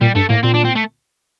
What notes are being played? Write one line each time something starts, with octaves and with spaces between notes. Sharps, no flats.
A#2 G3
G2 A3
A2 A#3
A#2 C4
D4
C4
A3